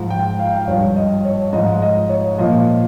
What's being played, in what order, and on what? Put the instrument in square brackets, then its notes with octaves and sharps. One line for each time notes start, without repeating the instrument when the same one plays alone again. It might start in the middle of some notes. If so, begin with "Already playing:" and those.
Already playing: [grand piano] G#2 F3
G5
F5
G5
F5
G2 F3 C#5
D#5
C#5
G#2 F3 D#5
D#5
C#5
A#2 F3 D#5